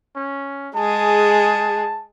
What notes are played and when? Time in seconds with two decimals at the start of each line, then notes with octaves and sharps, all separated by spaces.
0.16 C#4
0.76 G#3 G#4 A5